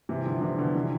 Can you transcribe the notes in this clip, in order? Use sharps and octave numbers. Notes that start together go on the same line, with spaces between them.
C3 E3
D3 F3
C3 E3
B2 D3
C3 E3